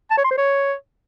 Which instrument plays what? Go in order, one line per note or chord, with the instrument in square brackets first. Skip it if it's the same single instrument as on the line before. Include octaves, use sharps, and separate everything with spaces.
[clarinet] A5
C#5
C6
C5
C#5